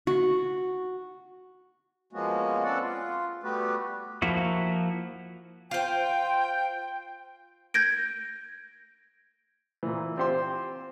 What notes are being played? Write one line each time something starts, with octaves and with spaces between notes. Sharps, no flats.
F#4
F3 G#3 A#3 B3 C#4 F#4
C4 C#4 A4 B4 D5 F#5
F4
G3 A3 B3 F#4 G4 B4
F3 A#3 E4 F#4
F4 C5 G5
G6 G#6 A#6 D7
A#2 E3
C4 F4 G4 C5 G5 C6